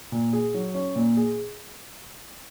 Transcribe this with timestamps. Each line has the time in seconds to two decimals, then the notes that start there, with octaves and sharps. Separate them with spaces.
0.12 A#2
0.33 G#4
0.54 F#3
0.74 C#4
0.96 A#2
1.17 G#4